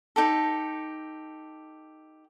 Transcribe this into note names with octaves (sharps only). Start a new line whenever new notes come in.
D#4 G4 A4